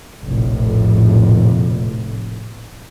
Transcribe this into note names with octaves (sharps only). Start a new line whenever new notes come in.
F1 A#1 A2